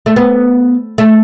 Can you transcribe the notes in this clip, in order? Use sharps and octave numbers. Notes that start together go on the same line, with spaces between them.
A3
B3
A3